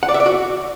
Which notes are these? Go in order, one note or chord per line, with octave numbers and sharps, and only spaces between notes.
F#5
D5
E5
D5
F#4